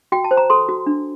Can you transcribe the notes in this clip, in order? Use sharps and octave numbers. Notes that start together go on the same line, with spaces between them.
F#4 G5
A5
C5
A#5
A4 C6
F#4
D4